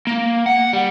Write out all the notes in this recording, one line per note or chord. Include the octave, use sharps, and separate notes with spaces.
A#3
F#5
G3